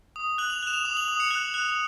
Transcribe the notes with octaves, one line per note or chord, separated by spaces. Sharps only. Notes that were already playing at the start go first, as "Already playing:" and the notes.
D#6
F#6 F#7
F7
F#6 E7
F7
D#6
F#7
D#6
C#7
F#6
F#6